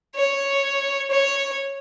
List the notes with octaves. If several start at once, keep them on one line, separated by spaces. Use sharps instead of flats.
C#5
C#5